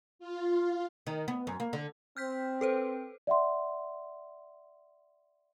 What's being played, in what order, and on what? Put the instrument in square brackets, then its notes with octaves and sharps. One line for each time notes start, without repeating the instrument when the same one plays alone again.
[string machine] F4
[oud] D#3
B3
F#2
A#3
D3
[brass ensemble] C4 [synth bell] F6 G6 B6
[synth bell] A4 B4 C5
[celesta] D5 E5 F#5 C6